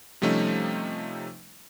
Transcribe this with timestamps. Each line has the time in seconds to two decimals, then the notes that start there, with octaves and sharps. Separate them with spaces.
0.22 C3 F3 G3 A3 C#4 D#4